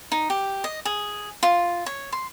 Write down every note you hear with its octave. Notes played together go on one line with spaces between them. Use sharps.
D#4
G4
D#5
G#4
F4
C#5
C6